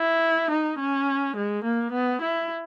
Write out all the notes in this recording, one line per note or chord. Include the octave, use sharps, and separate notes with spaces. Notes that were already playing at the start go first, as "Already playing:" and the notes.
Already playing: E4
D#4
C#4
G#3
A#3
B3
E4